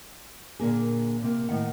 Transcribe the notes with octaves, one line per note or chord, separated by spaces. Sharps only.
A#2 D3 A#3 G#4
C3 A#3
A2 D#3 F#5